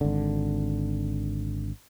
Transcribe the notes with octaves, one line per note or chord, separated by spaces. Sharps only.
G#1 D3